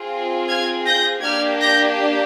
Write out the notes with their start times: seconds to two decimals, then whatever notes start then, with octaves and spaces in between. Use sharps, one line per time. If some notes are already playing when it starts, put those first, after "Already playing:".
Already playing: C4 F4 G#4
0.49 F6 G#6
0.86 G6 A#6
1.23 A#3 D4 G4 F6 G#6
1.60 G6 A#6